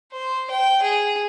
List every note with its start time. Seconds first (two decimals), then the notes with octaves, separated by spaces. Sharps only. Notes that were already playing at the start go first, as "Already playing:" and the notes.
0.12 C5
0.51 G5
0.82 G#4